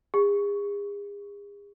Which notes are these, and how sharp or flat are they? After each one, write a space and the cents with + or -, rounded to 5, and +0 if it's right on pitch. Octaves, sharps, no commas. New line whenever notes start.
G#4 -40